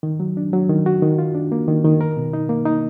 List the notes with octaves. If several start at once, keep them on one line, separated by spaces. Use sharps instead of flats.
D#3
F#3
D4
F#3
D#3
F#4
D#3
F4
D4
A#3
D#3
D#3
A#4
B2
D#4
A#3
D#4